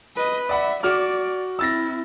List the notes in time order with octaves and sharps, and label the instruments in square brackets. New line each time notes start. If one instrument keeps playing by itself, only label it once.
[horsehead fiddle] B4 D#5
[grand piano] D5 F#5 B5 [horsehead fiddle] E5
[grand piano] F#4 D6 F6 [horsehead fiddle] D5
[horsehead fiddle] C4 E4 [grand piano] E6 A6 A#6